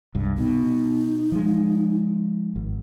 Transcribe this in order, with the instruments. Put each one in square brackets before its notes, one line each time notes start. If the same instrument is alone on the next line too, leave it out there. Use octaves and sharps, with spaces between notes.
[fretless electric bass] C2 G2
[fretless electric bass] B2 [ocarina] D#4
[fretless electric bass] F3 G#3
G#1